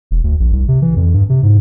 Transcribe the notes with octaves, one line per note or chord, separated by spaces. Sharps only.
E1
D2
A#1
C2
C3
E3
F2
G2
C3
G#2